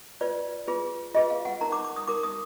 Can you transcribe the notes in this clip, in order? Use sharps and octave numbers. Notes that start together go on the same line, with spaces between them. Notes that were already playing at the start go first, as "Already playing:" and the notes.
F4 B4 D5
F4 G#4 B4
F4 G#4 B4 D#5
F5
F#5
D#4 A#4 A#5
D6
D6
D#6
D#4 A#4 D6
D#6